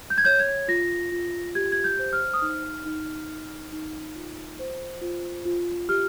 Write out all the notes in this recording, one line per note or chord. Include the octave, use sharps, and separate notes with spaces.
G6
G#6
C#5 G6
G#6
F4 A#6
F4
G4 G#6
G#6
G6
C5
F6
D#6
D#4 F6
D#4
D#4
D#4
F4
C5
F4
F4
G4 F6